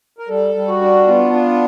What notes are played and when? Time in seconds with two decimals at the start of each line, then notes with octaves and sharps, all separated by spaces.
0.19 A#4
0.29 G3 A4
0.55 G3
0.68 F#4
0.82 D4
1.07 B3 F4
1.33 D4